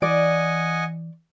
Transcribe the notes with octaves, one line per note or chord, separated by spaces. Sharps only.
E3 D5 D#5 F#5 G#5